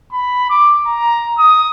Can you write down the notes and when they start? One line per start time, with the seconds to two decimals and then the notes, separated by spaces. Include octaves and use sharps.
0.12 B5
0.50 D6
0.86 A#5
1.38 D#6